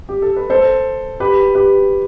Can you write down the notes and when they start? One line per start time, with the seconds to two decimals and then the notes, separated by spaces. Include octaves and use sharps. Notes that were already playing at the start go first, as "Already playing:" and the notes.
0.09 G4
0.22 A4
0.37 B4
0.50 A4 C5
1.20 G4 B4
1.55 G4 B4